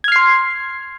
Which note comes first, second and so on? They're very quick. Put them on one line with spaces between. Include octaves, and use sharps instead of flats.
G#6 F6 C7 C6